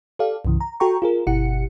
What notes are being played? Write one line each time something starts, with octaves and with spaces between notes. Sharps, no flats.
G4 A4 D5 F5
C2 G2 C#3 E3
A#5
F#4 A4 G5 A#5 C#6
F4 G#4 A#4
G1 B2 E4 G4 F#5 C#7